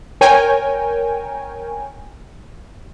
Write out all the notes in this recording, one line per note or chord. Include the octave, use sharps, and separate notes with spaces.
A#4 C#5 G5 G#5